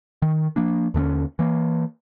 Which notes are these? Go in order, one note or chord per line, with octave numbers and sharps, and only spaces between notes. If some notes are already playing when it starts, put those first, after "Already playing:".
D#3
F3 A#3 D4
D#2 D3 B3 C#4
E3 A#3